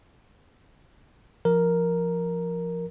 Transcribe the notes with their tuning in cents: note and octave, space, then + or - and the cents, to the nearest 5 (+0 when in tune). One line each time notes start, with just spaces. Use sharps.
F3 -10 A#4 +0